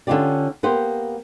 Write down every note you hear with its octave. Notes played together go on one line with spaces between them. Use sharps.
D3 C#4 D#4 F4 G4 D5
A#3 B3 G4 C5